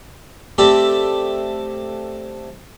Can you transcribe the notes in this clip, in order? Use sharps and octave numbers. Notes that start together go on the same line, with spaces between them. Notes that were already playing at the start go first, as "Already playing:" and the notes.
A3 C4 G4 D5 E5